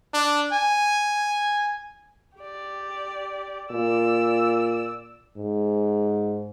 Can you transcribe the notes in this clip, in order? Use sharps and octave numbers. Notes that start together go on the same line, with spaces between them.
D4
G#5
G4 D5
A#2 D5 E6
G#2